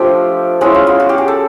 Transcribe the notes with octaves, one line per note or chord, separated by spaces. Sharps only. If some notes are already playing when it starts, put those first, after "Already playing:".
Already playing: F3 A3 D4 F4 G4
G#3 C#4 E4 F#4
F4
F4
F#4
G4
G#4
A4